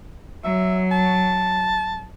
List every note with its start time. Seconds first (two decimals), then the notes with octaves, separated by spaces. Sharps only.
0.44 F#3 E5
0.91 A5